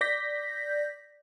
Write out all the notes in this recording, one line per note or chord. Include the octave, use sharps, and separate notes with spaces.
D5 G6 A#6 B6